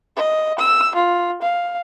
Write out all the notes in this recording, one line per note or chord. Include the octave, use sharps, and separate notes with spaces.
D#5
E6
F4
F5